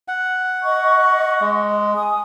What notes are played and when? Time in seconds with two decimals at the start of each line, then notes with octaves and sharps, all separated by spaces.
0.08 F#5
0.62 D#5 C#6
1.41 G#3
1.93 G#5 D#6